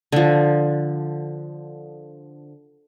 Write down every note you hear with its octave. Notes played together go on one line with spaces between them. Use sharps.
D3 F3